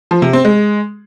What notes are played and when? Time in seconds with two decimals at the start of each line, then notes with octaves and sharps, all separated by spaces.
0.11 F3
0.22 C3
0.33 C4
0.45 G#3